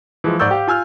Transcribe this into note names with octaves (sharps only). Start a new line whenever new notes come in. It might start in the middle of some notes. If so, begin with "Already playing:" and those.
E3 F3 G#3
G#2 D5 C#6 E6 G6
G4 F5
F4 G#5 E6 F6